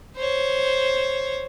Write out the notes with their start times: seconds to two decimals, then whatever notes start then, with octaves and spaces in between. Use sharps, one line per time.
0.17 C5 C#5